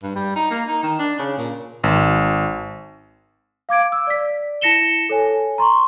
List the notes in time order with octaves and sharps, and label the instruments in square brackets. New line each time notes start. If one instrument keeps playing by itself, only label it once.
[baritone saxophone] G2
G3
D#4
A#3
D#4
D#3
D4
C#3
A#2
[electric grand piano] G#1
[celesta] F5 D6 G#6 D7
E6
D5 B6
E4 A5 A#6 C#7 E7 G7
A4 C#5 G#5
A#5 C6 C#6